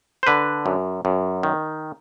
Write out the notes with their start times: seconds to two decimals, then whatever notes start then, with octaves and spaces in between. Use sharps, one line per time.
0.23 C5
0.27 D3 B4
0.66 F#2
1.05 F#2
1.43 D#3